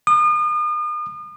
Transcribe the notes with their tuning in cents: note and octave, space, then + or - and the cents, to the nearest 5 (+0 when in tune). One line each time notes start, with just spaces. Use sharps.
D#6 -40